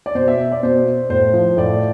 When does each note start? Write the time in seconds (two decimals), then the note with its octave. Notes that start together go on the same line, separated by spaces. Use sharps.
0.06 D5
0.15 B2 C5
0.28 E5
0.51 D5
0.63 B2 C5
1.09 A2 C5
1.33 F3
1.57 A2 D5